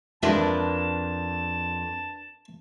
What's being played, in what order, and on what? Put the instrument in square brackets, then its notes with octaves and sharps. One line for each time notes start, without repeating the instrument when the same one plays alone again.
[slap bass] F2 [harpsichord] G#2 F4 E5 [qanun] D4 A#4 B4 [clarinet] A5